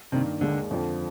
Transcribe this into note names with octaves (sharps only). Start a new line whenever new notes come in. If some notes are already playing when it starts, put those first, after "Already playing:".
G2 C3 D#3 A#3
D#2 D3 D#3 G#3 D4
F2 D3 F3